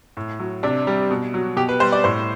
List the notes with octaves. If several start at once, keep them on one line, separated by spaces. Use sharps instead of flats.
A2
F#3
C3 D4
G3
B2
F#3
B2 G4
B4
G3 C5
D5
A2 C5